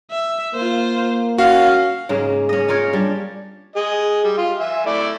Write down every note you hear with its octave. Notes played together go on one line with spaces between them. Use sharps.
E5
A#3 F4 C5
C#4 F#4 F5
G#2 C#3 A#3 C#4
C#4 D#5
D#4 F4 A#4 C#5
G3 D4
G#4 D#5
G3
F4
E5 G#5
A3 E4 D5